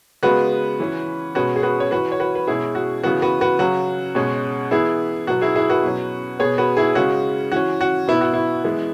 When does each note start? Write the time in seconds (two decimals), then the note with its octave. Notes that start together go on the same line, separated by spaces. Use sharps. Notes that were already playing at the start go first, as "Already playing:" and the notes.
0.23 C#3 G#3 B3 F#4 B4
0.80 E3 C#4
1.35 B2 G#3 C#4 F#4 B4
1.56 G#4
1.63 F#4 B4
1.80 C#5
1.91 E3 C#4 F#4 B4
2.12 C#5
2.20 F#4 B4
2.35 B4
2.47 B2 G#3 C#4 E4 G#4
2.75 F#4
3.03 C#3 E3 B3 F#4
3.22 F#4 B4
3.41 F#4 B4
3.59 C#3 F#3 C#4 F#4
4.15 B2 G#3 C#4
4.71 E3 B3 E4 G#4
5.27 B2 F#3 B3 F#4
5.41 E4 G#4
5.56 E4 G#4
5.70 F#4 B4
5.84 B2 F#3 C#4
6.39 B2 B3 G#4 C#5
6.58 F#4 B4
6.77 E4 G#4
6.95 C#3 G#3 C#4 F#4
7.52 E3 C#4 F#4
7.81 F#4
8.08 B2 B3 E4
8.21 F#4
8.34 E4
8.64 E3 G#3 B3